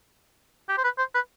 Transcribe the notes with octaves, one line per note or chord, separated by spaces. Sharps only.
G4
C5
B4
C5
B4